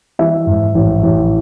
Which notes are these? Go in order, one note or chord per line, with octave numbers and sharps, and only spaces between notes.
E3 E5
G#2
A1
A1